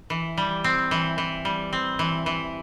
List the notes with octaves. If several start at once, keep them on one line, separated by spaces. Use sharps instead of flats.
E3
G3
C4
E3
E3
G3
C4
E3
E3